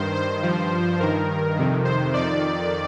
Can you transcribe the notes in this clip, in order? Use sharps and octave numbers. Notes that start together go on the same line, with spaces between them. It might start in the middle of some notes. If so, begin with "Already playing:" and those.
Already playing: G2 D#3 C5
C5
G2 F3
G2 D#3 A#4
F2 C3 D#3
C5
F2 D#3 D5